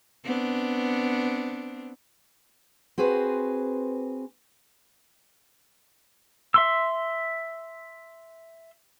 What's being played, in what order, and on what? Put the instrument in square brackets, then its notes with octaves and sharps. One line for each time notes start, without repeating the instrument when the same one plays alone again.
[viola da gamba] B3 C4 D4
[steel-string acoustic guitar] C4 F#4 G#4 B4 C5
[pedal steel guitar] E5 C6 E6